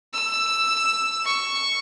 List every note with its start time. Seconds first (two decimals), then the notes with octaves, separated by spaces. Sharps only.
0.13 E6
1.25 C#6